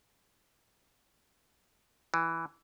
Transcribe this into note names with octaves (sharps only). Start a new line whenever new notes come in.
E3